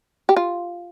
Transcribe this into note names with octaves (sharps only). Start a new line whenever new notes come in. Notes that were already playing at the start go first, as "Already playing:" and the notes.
G4
F4